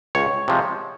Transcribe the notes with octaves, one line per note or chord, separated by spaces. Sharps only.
C#2 C#5
C3 F3 G#3